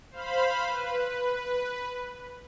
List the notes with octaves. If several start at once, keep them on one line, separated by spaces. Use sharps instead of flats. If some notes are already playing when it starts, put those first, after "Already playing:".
C5 F5 B5
B4